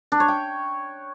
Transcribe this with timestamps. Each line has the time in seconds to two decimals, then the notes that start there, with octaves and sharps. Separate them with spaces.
0.12 D4
0.20 C#5
0.28 G5